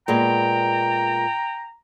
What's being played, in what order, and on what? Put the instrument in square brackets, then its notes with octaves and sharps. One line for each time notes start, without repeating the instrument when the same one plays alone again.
[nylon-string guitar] A#2 G#3 B3 [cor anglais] G5 [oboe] A#5